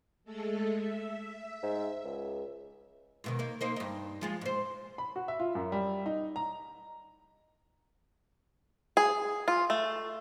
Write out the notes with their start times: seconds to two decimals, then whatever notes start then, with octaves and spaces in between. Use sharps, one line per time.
0.24 G#3 A3 A4
0.76 E5
1.63 G#2
2.05 C#2
3.24 G#2 B2 D#3
3.39 A#3 D#4
3.61 A#3 D#4 C5
3.76 G2 D#4
4.21 F3 G#3 F4
4.41 G#2 C5
4.98 B5
5.16 F#4
5.28 E5
5.40 F4
5.55 F#2
5.72 G3
6.06 D#4
6.36 A#5
8.97 G#4
9.48 F4
9.70 A3